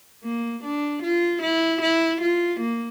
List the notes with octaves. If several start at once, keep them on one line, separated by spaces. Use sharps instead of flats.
A#3
D4
F4
E4
E4
F4
A#3